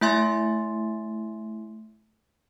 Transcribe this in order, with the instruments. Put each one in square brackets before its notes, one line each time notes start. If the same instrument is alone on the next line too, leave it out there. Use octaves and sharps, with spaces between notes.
[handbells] A3 E4 E5 G#5 C6 A6